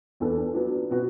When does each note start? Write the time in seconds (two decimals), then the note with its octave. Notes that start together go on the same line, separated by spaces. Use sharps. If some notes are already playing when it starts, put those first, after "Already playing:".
0.20 E2 E3 B3 D4 A4
0.54 F#3 B3 D4
0.89 B2 B3 F#4